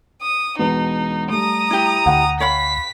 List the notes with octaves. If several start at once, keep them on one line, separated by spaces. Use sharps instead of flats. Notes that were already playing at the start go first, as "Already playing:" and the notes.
D#6
E1 B2 D#4 B4
G3 A3 A#5 D#6
E4 G4
D2 F#5 G5
C#5 F5 B5 B6